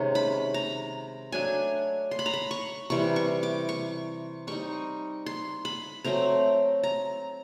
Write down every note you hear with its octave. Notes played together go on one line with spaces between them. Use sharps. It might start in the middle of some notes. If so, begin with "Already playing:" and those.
Already playing: C3 D#3 G#3 C#4 C#6
B5
A#5
F#3 A3 D4 G#5
C6
B5
A#5
B5
C#6
C3 E3 G3 C#6
C#6
D6
C#6
G3 C4 D#4 C#6
C6
B5
F#3 A3 C4 A#5
A#5